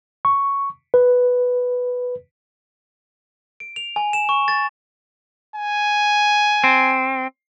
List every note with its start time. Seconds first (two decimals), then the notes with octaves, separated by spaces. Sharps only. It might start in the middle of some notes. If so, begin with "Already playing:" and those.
0.25 C#6
0.94 B4
3.60 D7
3.76 F7
3.96 G#5
4.13 E7
4.29 C#6
4.48 A6
5.55 G#5
6.64 C4